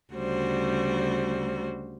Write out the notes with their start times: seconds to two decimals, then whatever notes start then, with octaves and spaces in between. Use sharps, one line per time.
0.12 D2 C#3 G3 F#4 C5